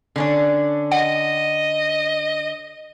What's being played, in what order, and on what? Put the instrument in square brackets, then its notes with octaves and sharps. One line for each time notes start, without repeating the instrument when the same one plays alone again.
[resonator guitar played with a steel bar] D3 C#4 D4
[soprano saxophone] D#5 [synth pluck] F#5